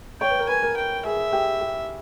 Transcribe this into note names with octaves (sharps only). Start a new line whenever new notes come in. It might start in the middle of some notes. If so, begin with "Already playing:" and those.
C#5 G5
B4
A#4
B4 G#5
A#4
G5
G#4 E5
G4
G4